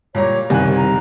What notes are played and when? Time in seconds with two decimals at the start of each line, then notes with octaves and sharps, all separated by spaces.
0.15 A#2 G3 C#5 A#5
0.50 F#1 C2 D#3 G#5 F#6
0.76 A#5